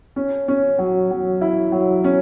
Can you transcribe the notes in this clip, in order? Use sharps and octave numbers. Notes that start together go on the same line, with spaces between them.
C#4
C#4
F#3
F#3
E4
F#3
C#4